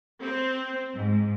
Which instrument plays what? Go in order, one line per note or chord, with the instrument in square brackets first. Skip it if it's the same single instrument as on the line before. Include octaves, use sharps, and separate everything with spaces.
[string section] C4
G#2